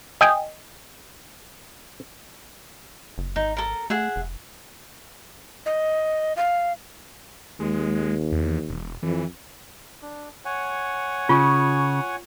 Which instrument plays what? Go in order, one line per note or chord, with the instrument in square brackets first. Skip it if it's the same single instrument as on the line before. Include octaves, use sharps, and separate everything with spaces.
[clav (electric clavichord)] D#5 G5 G#5
[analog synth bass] F#1
[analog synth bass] G#1 [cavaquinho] D#4
[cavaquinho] A4 A#4
[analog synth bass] A3 [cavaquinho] G#4 E5 F#5
[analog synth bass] F1
[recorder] D#5
F5
[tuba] D#2 [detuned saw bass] G#3
[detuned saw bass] E2
E1
[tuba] F2 [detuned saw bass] E3
[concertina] D4
C#5 F#5 G#5
[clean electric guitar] C#3 [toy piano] F4